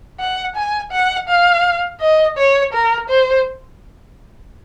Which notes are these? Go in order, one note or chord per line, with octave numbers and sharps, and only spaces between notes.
F#5
G#5
F#5
F5
D#5
C#5
A#4
C5